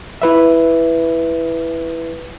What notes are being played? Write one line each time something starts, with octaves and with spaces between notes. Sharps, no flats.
E4 B4 E5